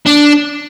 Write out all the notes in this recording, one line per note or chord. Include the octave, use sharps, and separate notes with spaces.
D4